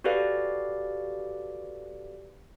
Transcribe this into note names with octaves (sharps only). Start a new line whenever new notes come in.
F#4 G4 A4 B4 D5 F5